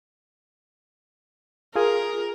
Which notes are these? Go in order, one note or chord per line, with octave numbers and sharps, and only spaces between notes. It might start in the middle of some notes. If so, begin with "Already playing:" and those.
F4 G#4 A#4